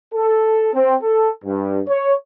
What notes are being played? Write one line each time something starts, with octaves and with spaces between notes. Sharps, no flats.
A4
C4
A4
G2
C#5